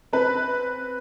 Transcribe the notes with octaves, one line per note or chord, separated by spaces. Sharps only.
C4 B4